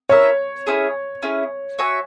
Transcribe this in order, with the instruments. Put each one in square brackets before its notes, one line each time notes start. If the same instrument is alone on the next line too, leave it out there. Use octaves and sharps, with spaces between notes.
[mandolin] C#4 E4 A#4 E5 [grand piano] C#5
[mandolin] C#4 E4 G#4
C#4 E4 G#4
F#4 C#5 E5 G#5